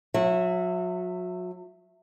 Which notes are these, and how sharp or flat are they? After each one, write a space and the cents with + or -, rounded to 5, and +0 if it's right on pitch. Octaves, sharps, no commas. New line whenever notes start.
F#3 -35 E5 +5